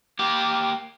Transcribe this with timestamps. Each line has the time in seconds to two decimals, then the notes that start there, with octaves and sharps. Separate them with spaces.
0.19 A#3 G4